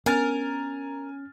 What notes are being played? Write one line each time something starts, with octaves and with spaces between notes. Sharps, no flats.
B3 C#4 D4 A#4 G#5 F6 A6